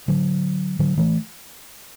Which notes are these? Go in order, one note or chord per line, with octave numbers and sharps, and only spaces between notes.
D3 F#3
D3 F#3
E3 A3